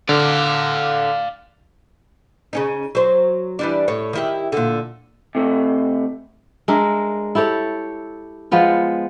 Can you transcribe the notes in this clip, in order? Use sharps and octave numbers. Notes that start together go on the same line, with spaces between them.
D3 D5 F5
C#3 C#4 D#4
F#3 C5
E3 G3 D4
A2 C#5
D#3 E4 G4
A#2 D3
C3 A3
G#3 D4 A#4 E5
E4 G4 A4 C#5
F3 G#3 B3 F4